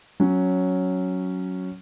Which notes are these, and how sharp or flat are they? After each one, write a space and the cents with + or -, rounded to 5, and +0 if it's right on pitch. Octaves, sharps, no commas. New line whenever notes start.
F#3 +0 C#4 +0